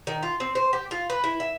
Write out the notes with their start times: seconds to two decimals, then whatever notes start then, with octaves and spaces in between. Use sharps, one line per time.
0.07 D#3
0.23 F4
0.40 C4
0.55 C5
0.73 G4
0.91 F4
1.10 B4
1.24 E4
1.40 E5